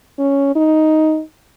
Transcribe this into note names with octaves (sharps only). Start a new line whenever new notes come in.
C#4
D#4